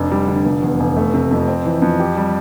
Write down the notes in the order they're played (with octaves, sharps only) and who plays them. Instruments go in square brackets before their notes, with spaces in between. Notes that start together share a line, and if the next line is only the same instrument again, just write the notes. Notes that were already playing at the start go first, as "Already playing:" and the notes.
Already playing: [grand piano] F1 D4
G3
D3
F1
E2
F1
A3
C3
F2
C4
E3
F2
G4
G3